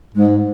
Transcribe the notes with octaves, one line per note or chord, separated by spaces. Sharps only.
G#2 G#3